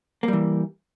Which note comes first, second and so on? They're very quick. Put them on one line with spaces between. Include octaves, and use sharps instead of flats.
A#3 G3 E3